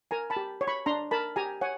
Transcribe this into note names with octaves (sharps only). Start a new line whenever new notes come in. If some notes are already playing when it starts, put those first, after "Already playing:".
A#4 G#5 A#5
A5 B5
G4
C#5
B5 C#6
D4 A#5 C6
A#4 A5 B5
G4 G#5 A#5
C#5 F#5 G#5